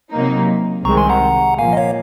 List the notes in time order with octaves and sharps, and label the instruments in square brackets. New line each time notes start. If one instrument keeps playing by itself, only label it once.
[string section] C3 F#3 A#3 D#4
[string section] C2 C3 D#3 G#3 C4 [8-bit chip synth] A#5 C#6
[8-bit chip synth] G#5 C6
F#5 A#5
[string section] A#2 F3 A#3 [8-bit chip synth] F5 G#5
[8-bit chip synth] D#5
C#5 F5